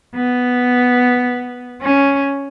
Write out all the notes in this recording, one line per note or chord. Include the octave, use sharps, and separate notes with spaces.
B3
C#4